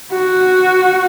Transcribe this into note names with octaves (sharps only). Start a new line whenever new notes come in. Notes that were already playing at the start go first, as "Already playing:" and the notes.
F#4